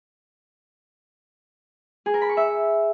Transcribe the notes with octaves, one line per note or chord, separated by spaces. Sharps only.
G#4
A#4
B5
C#6
E5